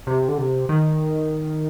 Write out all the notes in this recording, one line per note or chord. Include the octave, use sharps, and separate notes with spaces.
C3
D3
C3
D#3